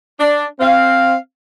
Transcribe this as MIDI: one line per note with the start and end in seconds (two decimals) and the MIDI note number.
0.20 0.45 62
0.60 1.16 60
0.60 1.16 77